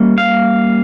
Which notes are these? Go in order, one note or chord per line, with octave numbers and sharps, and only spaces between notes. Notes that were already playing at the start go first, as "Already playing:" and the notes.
Already playing: G3 A#3 C#4
F5